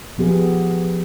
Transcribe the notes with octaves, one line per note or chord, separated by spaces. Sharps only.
F3 B3 G4 G#4